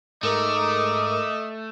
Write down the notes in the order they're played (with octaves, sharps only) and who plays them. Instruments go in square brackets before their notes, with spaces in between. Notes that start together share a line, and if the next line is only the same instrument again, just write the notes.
[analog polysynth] G#2 A#4 D#6 [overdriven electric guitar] A3 [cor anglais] D#5 [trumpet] D6